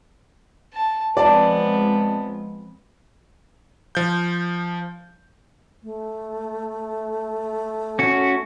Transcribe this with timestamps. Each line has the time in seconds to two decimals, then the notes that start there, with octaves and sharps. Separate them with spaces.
0.74 A5
1.17 F3 G#3 B3 C4 D5 A5
3.95 F3 G6
5.83 A3
7.99 C#4 F#4